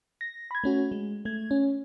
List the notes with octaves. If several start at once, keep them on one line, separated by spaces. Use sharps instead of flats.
A#6
B5 G#6
A3 C#4 F#4
G#3
A3 G#6
C#4